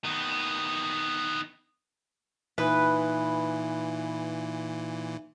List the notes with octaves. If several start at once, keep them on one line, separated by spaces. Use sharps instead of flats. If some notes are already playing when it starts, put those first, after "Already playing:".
D#3 B3
A#2 E3 D#4 B4 E5 G#5